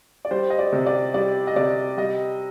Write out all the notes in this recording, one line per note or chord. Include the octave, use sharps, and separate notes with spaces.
D5
G3 C5
D#5
D5
C3
D5
G3 D5
D#5
C3 D5
G3 D#5